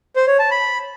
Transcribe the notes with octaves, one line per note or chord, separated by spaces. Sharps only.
C5
C#5
A5
B5